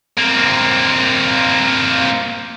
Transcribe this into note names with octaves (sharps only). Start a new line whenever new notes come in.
A#3 C4